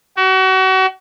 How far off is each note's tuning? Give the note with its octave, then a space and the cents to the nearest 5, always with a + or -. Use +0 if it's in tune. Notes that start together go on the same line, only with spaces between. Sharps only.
F#4 +35